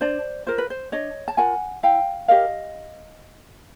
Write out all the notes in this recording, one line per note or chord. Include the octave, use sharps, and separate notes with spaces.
D4 C5 D5
F4 A#4 C5
B4
C5
D4 C#5 D#5
A5
F4 A#4 F#5 G#5
E4 F5 G5
G4 A#4 D#5 F5